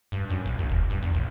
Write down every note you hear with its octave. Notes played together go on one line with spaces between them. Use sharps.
G2
F#2
A#1
D#2
F1
G2
E2
A#1